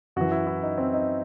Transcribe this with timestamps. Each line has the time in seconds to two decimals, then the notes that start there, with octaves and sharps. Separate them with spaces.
0.16 F#2 E3 F#4
0.31 E4
0.47 E4
0.63 D#4
0.78 C4
0.93 D#4